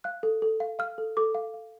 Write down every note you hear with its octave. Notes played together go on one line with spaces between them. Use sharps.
F5 F#6
A4
A4
F5
F5 F6
A4
A4 D6
F5
F5